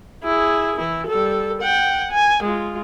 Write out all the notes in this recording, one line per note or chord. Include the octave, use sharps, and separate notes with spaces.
E4 G#4
E3 E4
G3 A4
F#5 G5
G#5
G#3 F4